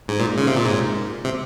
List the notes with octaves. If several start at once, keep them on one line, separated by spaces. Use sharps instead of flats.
G#2
A#2
C#3
C3
A#2
G#2
C3